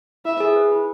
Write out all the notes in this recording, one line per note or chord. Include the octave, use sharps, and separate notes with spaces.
E4 E5
G#4
B4
E4